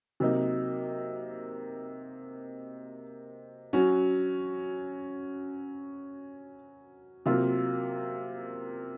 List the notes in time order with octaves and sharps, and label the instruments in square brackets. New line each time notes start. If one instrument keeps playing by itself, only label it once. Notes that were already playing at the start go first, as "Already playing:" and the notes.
[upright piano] C3 F#3 A#3 D#4
F#3 C#4 F#4
C3 F#3 A#3 F4